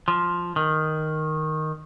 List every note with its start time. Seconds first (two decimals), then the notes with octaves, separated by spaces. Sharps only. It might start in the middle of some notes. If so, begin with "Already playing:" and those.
0.08 F3
0.56 D#3